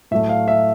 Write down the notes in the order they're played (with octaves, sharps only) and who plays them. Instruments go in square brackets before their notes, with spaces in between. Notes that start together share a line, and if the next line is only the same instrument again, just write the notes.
[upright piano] A2 F#3 A3 E5
F5
E5